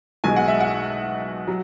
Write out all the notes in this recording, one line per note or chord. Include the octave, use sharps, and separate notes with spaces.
B1 B2 G#3 G#5
F#5
E5
F#5
F#3